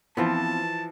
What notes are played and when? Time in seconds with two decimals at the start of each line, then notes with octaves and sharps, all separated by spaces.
0.17 E3 F3 B3 C4 F4 A5